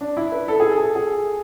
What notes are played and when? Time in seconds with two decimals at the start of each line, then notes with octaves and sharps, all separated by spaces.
0.01 D4
0.17 E4
0.32 B4
0.48 A4
0.60 G#4
0.71 A4
0.84 A4
0.95 G#4